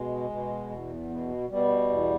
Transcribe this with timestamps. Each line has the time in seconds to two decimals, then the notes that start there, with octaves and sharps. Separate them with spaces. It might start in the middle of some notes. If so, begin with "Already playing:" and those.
Already playing: B2 G#3
0.30 B2
0.70 E2
1.09 B2
1.50 B2 G3
1.89 E2